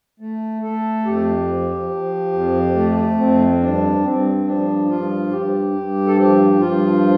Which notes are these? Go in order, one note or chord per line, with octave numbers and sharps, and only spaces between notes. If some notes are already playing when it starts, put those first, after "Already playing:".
A3
A3 A4
F2 G4
F3
F3
F2
A3
F2 C4
G2 D4
G2 C4
F3 D4
G2 F4
G2 G4
G2
A4
F3 G4
G2 F4